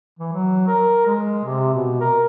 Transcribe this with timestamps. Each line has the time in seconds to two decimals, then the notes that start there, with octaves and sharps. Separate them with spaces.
0.19 E3
0.33 F#3
0.68 A#4
1.06 G#3
1.45 C3
1.73 B2
2.01 A#4